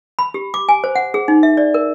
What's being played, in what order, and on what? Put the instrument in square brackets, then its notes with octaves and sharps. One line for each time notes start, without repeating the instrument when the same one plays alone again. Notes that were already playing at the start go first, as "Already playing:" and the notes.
[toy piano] B5
G4
D6
G#5
C5
F#5
G#4
D#4
E5
D5
A#4